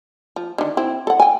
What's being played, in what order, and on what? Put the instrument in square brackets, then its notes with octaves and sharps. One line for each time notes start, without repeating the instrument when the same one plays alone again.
[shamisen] F3
D3 D#3
C4 E4
A4 F#5
G5 G#5